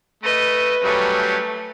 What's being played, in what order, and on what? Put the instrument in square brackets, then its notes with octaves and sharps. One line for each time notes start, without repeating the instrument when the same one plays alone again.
[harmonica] A3 [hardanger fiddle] B4 [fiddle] D#5
[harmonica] F#3 G3 C#4 [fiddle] A3